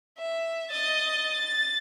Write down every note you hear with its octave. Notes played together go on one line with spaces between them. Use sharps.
E5
D#5 A6
A6